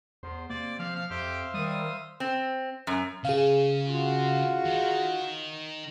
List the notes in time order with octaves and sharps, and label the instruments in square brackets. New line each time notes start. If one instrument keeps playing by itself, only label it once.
[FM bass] E2 [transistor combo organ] C5
[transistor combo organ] C3 [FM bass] A#3 [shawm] D5
[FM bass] F3 [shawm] F5
[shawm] F5
[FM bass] F2 [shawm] G4 [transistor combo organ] C5 E5 F5
[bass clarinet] D#3 [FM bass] G3 [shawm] D#6
[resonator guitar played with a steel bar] C4
F#2
[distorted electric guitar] C#3 [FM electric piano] G#4 F5
[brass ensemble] F4 F#4
[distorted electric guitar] D#3